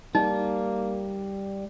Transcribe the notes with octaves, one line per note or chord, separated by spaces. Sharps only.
G3 A#3 D#4